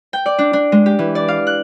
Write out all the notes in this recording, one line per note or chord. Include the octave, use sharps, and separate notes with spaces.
G5
D5
D4
D4
G#3
G4
E3
D5
F5
F#6